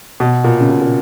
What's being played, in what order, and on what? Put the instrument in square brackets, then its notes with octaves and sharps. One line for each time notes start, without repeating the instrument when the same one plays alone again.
[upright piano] B2
A#2
C#3
B2
A#2